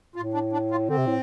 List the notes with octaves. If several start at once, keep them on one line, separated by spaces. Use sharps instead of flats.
A2 F4
D4
D4
F4
D3 C4
C3
A2